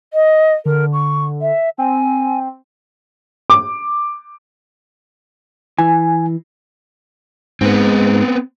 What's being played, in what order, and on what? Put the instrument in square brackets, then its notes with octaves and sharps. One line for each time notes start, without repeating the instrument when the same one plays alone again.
[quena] D#5
[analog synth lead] D3 [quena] A#4
[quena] C#6
E5
[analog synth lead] C4 [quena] G#5
[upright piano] D6
[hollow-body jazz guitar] E3 [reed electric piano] G#5
[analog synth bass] G#2 [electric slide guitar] B3 C4